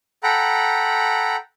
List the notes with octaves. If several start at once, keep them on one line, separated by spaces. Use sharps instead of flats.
A4 F#5 G5 A#5 B5